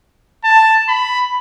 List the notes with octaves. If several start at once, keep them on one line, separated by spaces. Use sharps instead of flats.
A5
B5